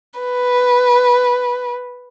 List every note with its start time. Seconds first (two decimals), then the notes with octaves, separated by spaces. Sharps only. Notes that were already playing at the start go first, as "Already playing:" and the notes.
0.20 B4